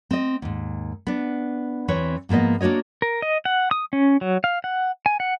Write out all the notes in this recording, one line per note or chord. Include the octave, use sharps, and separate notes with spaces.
C4 D#5
D#2 G#2
B3 D4
E2 E3 C4 B4 C#5
G#2 F3 A#3 B3 D#5
A#3 D4 F#4 C#5 D#5
A#4
D#5
F#5
D#6
C#4
F#3
F5
F#5
G#5
F#5